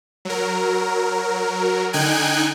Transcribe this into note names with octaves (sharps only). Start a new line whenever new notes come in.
F#3 A#4
D3 D#4 G5 G#5 F#6 G#6